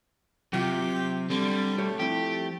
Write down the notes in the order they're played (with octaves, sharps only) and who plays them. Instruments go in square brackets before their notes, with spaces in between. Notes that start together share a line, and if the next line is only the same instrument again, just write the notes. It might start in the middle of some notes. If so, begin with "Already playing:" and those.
[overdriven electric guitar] C3 [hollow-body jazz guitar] F#3 F4 [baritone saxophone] G4
[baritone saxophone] D3 [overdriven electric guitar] G3 [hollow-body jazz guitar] C4
[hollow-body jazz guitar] B1 G4 C#5 [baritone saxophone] A3
[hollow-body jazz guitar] F3 C4 E4 [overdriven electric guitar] G4